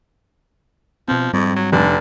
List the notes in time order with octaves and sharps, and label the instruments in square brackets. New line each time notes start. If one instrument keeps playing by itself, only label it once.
[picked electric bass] B2 C4 [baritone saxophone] F3
[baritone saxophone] F2 [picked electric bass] G#2 G3 C4
[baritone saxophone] F#3
[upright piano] F1 [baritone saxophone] D3